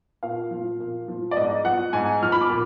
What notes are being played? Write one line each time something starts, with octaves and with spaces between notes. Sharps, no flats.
A#2 F5
F3
A#2
F3
D5
G#2 D#5
F3 F#5
G#2 G#5
F3 F6
B5
D6
A#2